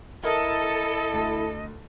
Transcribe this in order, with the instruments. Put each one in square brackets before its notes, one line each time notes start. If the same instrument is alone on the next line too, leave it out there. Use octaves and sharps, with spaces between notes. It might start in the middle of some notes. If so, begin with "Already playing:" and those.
[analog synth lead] E4 [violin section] A4 [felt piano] A#4 [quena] D#5
[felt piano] D2 A5